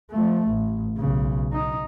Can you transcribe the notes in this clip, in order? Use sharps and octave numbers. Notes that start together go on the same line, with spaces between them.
F3 A3
A1
B1 C#3
D#4